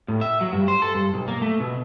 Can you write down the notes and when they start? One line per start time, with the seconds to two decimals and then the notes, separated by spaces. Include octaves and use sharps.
0.08 A2
0.21 E5
0.41 F#3
0.53 G2
0.68 C5
0.82 A4
0.95 G2
1.14 B1
1.28 A#3
1.42 A3
1.60 B2